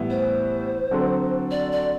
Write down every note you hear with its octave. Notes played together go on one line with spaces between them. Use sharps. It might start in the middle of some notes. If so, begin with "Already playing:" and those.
Already playing: A2 E3 G3 B3 E4
C5
D3 F#3 C4 F#4 A4
D5
D5